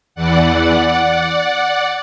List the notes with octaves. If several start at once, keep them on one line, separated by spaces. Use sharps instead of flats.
E2 E3 D5 F#5